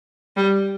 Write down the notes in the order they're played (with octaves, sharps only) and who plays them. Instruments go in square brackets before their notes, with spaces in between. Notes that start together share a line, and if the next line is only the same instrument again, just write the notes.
[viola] G3